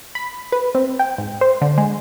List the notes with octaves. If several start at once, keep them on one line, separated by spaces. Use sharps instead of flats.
B5
B4
C4
G5
G#2
C5
D3
G#3